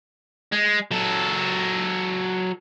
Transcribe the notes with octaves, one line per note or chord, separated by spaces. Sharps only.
G#3
F#3 A4